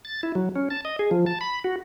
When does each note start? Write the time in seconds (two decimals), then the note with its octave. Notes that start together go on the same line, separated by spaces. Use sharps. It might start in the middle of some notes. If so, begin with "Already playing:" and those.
0.05 A6
0.23 E4
0.35 F#3
0.56 C#4
0.70 A5
0.85 D#5
0.99 G#4
1.11 F3
1.26 A5
1.41 B5
1.64 F#4